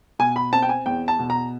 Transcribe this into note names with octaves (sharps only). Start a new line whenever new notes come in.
B2 G#5
B5
C4 A5
G5
G#5
E2 G5
A5
B2
A#5